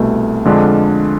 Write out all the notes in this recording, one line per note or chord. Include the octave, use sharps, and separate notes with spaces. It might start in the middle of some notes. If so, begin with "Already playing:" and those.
Already playing: C2 B2 A3
F2 D3 G#3 D4 F4